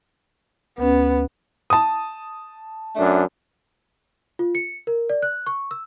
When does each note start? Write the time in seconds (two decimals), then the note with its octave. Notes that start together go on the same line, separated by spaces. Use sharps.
0.78 D2 B3 C#4
1.70 A5 D#6
2.96 F#2 A3 D4
4.39 F4
4.55 C#7
4.87 A#4
5.10 D5
5.22 F#6
5.46 C#6
5.71 E6